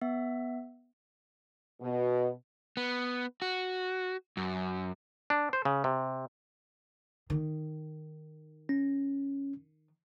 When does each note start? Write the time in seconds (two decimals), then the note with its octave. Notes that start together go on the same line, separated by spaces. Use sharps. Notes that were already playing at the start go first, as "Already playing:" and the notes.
0.01 B3 E5
1.81 B2
2.77 B3
3.42 F#4
4.37 F#2
5.30 D4
5.53 C5
5.65 C#3
5.84 C3
7.30 D#3
8.69 C#4